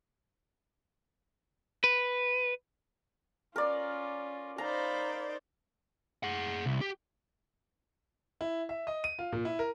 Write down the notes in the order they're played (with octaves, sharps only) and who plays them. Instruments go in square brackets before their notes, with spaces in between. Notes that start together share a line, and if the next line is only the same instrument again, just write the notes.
[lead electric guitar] B4
[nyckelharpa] C#4 F4 [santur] A#4 D5
[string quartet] D#4 C5 D5 [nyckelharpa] F5 B5 [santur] A#5
[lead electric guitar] G#4 F#5
C2
G4
[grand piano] E4
E5
D#5
D#7
F4
A#2
E4
A#4